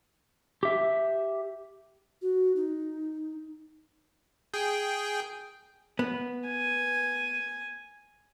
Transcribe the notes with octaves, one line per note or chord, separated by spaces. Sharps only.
G4 E5
F#4
D#4
G#4 G5
B3
G#5